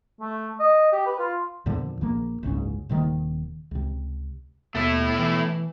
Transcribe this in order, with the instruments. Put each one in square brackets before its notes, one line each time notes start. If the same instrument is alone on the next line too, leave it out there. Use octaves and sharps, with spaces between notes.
[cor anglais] A3
D#5
G4
B4
F4
[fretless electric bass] E2 A#2 D3 F3
A#1 F3 A#3
F#1 C#2 G#2 C#4
D#1 C3 D#3 A#3
C#2 C3
[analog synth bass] D#2 [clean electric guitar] B2 [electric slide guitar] A3 E4
[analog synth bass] E3